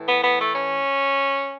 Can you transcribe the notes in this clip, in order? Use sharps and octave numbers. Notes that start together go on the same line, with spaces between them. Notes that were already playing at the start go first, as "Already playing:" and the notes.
Already playing: A2 E3
B3
B3
A3
C#4